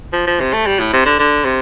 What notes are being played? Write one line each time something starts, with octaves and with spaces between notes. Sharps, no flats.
F3
F3
C3
A3
G3
A2
C3
D3
D3
C3